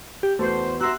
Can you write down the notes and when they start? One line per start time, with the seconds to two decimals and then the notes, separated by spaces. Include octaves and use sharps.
0.23 G4
0.39 E2 A3 F#4 C5
0.81 F#4 E5 A#5 C6 E6 F#6